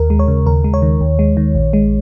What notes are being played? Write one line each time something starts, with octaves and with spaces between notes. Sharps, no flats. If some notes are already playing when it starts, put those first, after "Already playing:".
Already playing: D#2 A#4
G#3
C#5
C#3
D#2 A#4
G#3
C#5
D#3
D#2
G#3
D#3
A#1
G#3